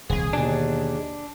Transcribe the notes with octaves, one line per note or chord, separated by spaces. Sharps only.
D#1 C2 G#4
D#2 B2 D3 D4